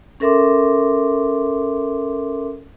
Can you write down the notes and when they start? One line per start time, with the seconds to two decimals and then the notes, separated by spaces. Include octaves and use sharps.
0.20 C#4 A4 A#4 E5 C6 D6